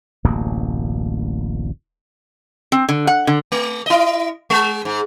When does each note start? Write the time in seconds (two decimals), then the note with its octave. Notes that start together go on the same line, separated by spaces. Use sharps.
0.24 D1 A1 F#2 A#3
2.72 C4
2.89 D3
3.07 F#5
3.27 D3
3.52 A3
3.86 E4 D#5
4.50 G#3
4.85 G#2